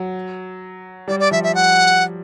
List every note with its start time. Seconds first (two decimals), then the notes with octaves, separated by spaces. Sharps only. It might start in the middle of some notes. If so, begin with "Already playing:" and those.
Already playing: F#3
1.08 G3 D5
1.20 D5
1.31 F3 E5
1.43 E5
1.55 F#5